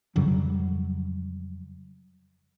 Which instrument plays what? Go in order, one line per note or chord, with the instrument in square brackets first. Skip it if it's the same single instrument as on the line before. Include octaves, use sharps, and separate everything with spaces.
[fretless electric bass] F2 C#3 F#3 G3